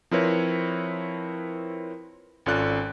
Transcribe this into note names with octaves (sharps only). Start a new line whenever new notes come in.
F3 C4 E4 A#4 B4 C#5
G#1 C#4 F4 A4 D5 F#6